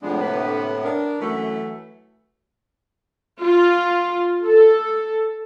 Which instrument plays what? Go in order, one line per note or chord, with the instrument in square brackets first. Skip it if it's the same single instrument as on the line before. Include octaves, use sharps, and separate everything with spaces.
[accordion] A2 C3 B3 [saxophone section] F3 G#3 D4
[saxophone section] D3 A#3 B4
D4 A#4
[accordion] F#2 [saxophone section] E3 F#3 A3
[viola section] F4
A4